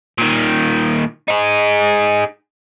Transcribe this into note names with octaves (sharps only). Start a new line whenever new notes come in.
A#2 D#3
D#4 G#4